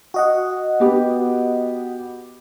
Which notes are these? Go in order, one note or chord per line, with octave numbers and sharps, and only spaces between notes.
F#4 D#5 F#5
B3 G4